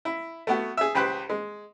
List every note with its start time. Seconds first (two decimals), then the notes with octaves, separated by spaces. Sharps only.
0.05 E4
0.47 A3 B3 F#4
0.77 G#4 E5
0.95 C#2 G4 B4 C5 F#6
1.30 G#3